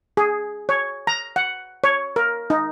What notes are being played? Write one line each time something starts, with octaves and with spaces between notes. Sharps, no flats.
G#4
C#5
A#5
F#5
C#5
A#4
D#4